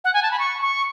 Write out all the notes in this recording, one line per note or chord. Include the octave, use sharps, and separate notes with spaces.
F#5
G#5
A5
B5
C#6
C#6